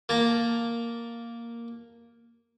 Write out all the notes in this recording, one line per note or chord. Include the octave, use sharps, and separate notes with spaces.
A#3 A5 A#5